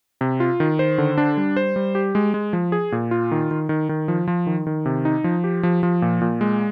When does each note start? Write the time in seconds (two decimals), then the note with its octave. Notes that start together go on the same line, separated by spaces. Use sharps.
0.21 C3
0.40 F4
0.60 D#3
0.79 C5
0.98 D3
1.18 D4
1.37 G3
1.57 C5
1.76 G3
1.95 G4
2.15 G#3
2.34 G#3
2.53 F3
2.72 G#4
2.92 A#2
3.11 F4
3.31 D#3
3.51 D#3
3.69 D#3
3.89 D#3
4.08 F3
4.28 F3
4.47 D#3
4.67 D#3
4.86 C3
5.05 D#4
5.24 F3
5.44 G4
5.63 F3
5.83 F3
6.02 A#2
6.21 A#2
6.41 G#3